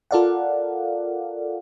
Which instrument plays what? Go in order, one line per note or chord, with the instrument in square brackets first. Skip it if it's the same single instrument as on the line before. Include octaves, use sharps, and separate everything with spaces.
[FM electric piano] F4 A4 A#4 D5 F5 F#5